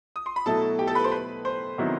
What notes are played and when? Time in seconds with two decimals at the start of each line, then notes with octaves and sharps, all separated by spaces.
0.16 D#6
0.26 C6
0.36 B5
0.46 B2 F#3 A3 E4 A4 A5
0.79 G4 G5
0.87 A4 A5
0.95 B4 B5
1.04 C5 C6
1.12 B4 B5
1.45 C5 C6
1.78 C3 D#3 F#3 B3 E4